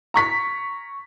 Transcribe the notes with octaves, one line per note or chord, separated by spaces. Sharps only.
A#5 C#6 B6